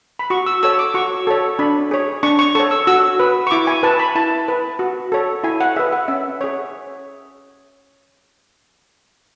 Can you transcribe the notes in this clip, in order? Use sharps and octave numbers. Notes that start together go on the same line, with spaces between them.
B5
F#4 C#6
E6
A4 C#5 E6
D6
F#4 C#6
A4 C#5
D4 B5
G#4 C#5
D4 C#6
C#6
A4 C#5 C#6
E6
F#4 E6
B4
C#6
E4 D6
G#5
B4 A5
B5
E4 A5
B4
F#4
A4 C#5
E4 G#5
F#5
G#4 B4 E5
F#5
C#4 E5
G#4 C#5